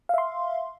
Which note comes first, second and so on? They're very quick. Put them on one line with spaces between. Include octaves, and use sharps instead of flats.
F5 E5 C6